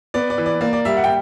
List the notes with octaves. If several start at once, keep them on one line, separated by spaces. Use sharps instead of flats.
B3 D5
D5
E3
D5
A#3 D5
D5
G3 E5
F#5
G5